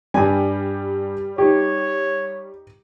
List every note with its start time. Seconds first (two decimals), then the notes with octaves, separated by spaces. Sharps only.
0.14 G2 G3 G#5
1.38 D#4 G4 C#5